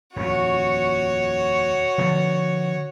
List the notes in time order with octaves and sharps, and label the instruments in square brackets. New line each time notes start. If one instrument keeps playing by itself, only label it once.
[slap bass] D#1 F2 [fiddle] F#4 C#5
[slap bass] D3 F3 B3